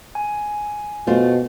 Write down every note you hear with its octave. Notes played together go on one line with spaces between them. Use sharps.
G#5
B2 A3 F4 C5